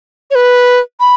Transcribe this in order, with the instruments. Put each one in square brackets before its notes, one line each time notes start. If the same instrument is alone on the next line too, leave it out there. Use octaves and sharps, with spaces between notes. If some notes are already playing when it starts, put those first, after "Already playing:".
[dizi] C#5
B4
B5